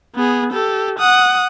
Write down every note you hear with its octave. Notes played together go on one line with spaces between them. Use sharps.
B3 G#4
G4 A4
F#5 D#6